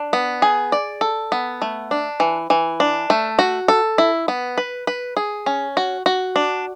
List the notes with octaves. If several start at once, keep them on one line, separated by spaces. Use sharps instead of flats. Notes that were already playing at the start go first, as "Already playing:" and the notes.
Already playing: D4
B3
G#4
D5
A4
B3
A3
D4
E3
E3
D4
A3
F#4
A4
E4
B3
B4
B4
G#4
C#4
F#4
F#4
D4